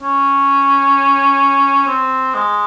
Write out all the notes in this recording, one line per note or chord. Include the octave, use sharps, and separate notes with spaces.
C#4
C4
G#3